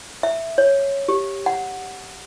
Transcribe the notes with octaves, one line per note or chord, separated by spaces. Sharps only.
E5
C#5
G4
F#5